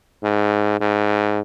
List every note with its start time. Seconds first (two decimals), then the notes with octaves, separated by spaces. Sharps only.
0.23 G#2
0.80 G#2